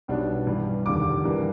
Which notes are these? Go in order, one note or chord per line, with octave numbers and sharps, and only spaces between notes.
B1 B2 G3 B3 D4
G2 E3 G3
F1 D#2 D3 G3 D6
G2 E3 G3 A#3 D4